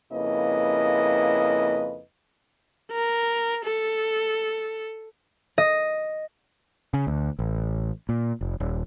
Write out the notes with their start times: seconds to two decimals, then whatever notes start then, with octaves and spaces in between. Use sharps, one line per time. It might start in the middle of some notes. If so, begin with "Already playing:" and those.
0.12 F2 C#3 A#3 E4 B4 D#5
2.92 A#4
3.65 A4
5.58 D#5
6.94 C#3
7.07 D2
7.39 A1
8.09 A#2
8.41 F1
8.60 D#1